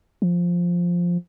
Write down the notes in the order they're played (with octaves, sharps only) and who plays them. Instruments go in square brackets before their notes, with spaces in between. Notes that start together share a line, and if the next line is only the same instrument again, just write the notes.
[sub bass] F3